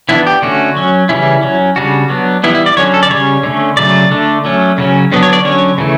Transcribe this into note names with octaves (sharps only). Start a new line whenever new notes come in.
E3 B3 D4 E4
G4
D3 A3 C#4 F#4
F#3 C#4
C#3 E3 G3 C#4 E4
F#3 C#4
C#3 G3 D4 F#4
F#3 B3 D4
E3 G3 B3 E4
E4
D5
D3 F#3 C#4 C#5
A4
D5
C#3 G3 C#4 C#5
D3 A3 C#4
C#3 F#3 A3 D5
D3 A3 D4
F#3 A3 C#4
C#3 F#3 C#4
D3 F#3 B3 D4
C#5
D5
D3 F#3 C#4 C#5
C#3 E3 A3